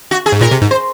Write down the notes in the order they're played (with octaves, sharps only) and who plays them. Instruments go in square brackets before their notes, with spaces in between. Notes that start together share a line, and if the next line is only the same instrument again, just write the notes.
[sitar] F#4
G#4
[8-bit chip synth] G#2
[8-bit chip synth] A#2 [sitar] A#4
[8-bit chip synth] C3
G#2
[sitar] C5